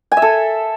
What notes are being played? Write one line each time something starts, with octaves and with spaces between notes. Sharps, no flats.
G#5
E5
A4